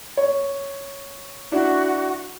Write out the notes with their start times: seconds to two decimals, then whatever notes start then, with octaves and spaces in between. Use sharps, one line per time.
0.17 C#5
1.52 D4 E4 F#4